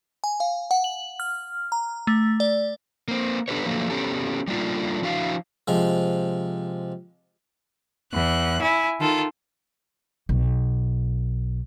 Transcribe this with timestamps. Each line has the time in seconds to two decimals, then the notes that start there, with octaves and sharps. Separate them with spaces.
0.24 G#5
0.40 F5
0.71 F#5
0.84 F#7
1.20 F6
1.72 A#5
2.07 A3
2.40 D5
3.08 A#3 C4
3.48 B3 D4 G4 A4 B4 C#5
3.66 D3 F3 F#3 A3 A#3
3.90 B3 C#4 G4 A4
4.48 G3 A3 A#3 D4 D#4 F4
5.02 F3 D4 E4 F#4 F5
5.68 C3 F3 G#3
8.13 E2 F#6
8.61 E4 G#5
9.00 D#3 F4 A4
10.29 B1